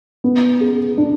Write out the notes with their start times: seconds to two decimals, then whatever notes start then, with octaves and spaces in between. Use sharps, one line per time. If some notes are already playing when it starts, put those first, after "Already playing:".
0.24 B3
0.61 G#4
0.98 D4